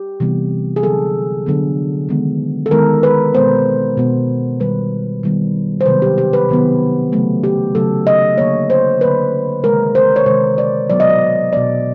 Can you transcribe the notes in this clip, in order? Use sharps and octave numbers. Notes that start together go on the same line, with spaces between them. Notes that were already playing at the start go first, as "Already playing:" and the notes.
Already playing: G4
C3 E3 G3 B3
G#4
D3 F#3 B3 A4
D3 F#3 B3
D#3 G#3 B3
A4
D#3 G#3 B3 A#4
B4
B2 G#3 B3 C5
B2 G#3 B3
D#3 G3 B3 B4
D#3 G3 B3
C5
C3 D#3 F#3 B3 B4
G4
G4
B4
C3 D#3 F#3 B3
C#3 F#3 A3
G4
C#3 F#3 A3 A4
D#5
D3 F#3 A#3 C#5
C5
D3 F#3 A#3 B4
C3 D#3 G#3 A#4
C5
C#5
C3 D#3 G#3 C5
D5
B2 F#3 B3 D5
D#5
D5
B2 F#3 B3 D5